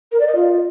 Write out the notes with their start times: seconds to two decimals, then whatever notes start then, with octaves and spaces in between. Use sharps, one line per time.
0.12 A#4
0.20 D5
0.27 D#5
0.35 F4